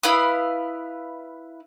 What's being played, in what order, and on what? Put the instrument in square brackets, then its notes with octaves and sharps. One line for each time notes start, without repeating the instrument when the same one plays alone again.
[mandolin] E4 B4 F5 D#6